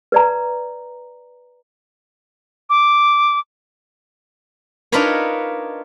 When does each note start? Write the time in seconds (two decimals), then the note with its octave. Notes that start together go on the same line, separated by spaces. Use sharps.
0.12 B4 D5 A#5
2.70 D6
4.92 D4 D#4 F4 A#4 B4 C#5